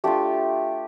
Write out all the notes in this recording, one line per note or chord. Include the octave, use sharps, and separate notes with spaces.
A3 D4 F4 G4